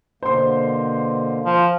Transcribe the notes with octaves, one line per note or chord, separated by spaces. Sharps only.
B2 D3 A#3 C5 C6
F3